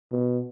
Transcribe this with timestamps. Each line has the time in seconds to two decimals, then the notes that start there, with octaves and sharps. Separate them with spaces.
0.12 B2